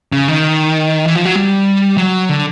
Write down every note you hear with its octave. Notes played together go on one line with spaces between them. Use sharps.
C#3
D#3
E3
F3
F#3
G3
F#3
D3